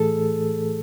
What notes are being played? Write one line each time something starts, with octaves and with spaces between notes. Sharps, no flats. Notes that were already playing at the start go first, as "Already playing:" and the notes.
Already playing: A2 E3 A3 G#4 A4